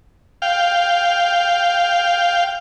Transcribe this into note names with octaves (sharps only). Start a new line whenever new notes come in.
F5 G5